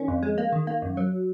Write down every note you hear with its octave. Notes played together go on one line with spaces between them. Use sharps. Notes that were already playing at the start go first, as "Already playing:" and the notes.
Already playing: D#3 A#3 C#4
F2
G#3
A#3
D#3
A#3
F#2
F#3